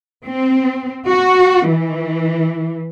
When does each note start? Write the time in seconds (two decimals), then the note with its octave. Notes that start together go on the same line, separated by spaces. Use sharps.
0.25 C4
1.07 F#4
1.69 E3